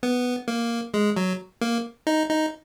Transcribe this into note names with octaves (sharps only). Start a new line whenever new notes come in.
B3
A#3
G#3
F#3
A#3
D#4
D#4